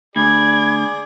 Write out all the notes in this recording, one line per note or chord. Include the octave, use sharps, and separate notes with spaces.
D2 G#4 D5 B5 G#6